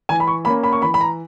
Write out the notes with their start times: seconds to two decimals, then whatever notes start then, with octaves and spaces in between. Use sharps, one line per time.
0.09 E3 G#5
0.20 B5
0.27 C#6
0.45 A#3 C#4 B5
0.64 B5
0.72 C#6
0.82 E3 B5
0.94 B5
1.01 A#5